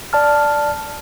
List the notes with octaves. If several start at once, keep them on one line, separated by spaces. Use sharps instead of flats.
D5 A5 F6